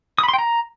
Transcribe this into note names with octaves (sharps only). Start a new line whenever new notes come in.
D#6
B5
C6
G5
A#5